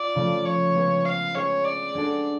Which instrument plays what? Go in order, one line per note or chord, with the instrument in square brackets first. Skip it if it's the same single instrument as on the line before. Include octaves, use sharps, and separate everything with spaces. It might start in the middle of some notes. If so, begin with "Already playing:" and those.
Already playing: [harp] F4 [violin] D5
[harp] C#3 F3 A3
[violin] C#5
[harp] G#3 B3 F4 G#4 B4
[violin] F5
[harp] G#3 C#4 G#4 B4 [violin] C#5
[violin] D5
[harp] G#3 D4 F#4 A4